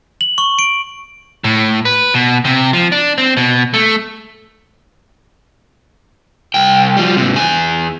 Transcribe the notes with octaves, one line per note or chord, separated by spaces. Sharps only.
F#7
C#6
D7
A2
B4
B2
C3
F3
D4
C4
B2
A3
C2 G5
F3 G3
G#2 C3
E2 G#5